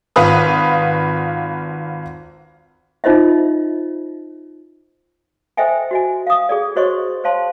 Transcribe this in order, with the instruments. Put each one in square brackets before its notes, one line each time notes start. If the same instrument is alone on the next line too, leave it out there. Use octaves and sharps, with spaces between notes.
[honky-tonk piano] G#1 F4 B4 D#6
[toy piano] D#4 F4 C5 D#5 E5
A4 C5 D#5 E5 G5 G#5
F#4 D#5 G#5
F5 D#6
G#4 A4 D5
F#4 C5 C#5 D#5 C6 C#6
C5 C#5 F5 A5 C6